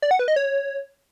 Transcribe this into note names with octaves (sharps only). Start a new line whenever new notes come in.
D5
F#5
B4
D#5
C#5